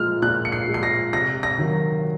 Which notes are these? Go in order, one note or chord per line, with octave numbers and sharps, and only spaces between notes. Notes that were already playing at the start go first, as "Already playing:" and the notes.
Already playing: A#2 F3 G#3 F6
A#2 F#6
C#7
C7
F3 G#3
C7
A#6
C3 A#6
A#6
D#3 F#3